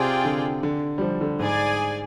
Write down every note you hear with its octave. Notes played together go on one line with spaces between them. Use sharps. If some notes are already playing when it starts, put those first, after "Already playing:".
Already playing: C3 F4 G#4 D5 G5
D3
D3
G3
F3
D3
G#2 G#4 D5 G#5